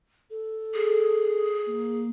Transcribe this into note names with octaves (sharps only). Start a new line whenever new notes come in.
A4
G#4
A#3